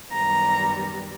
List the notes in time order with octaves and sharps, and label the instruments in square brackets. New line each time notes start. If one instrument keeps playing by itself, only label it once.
[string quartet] F#2 D#3 G3 B3 A#5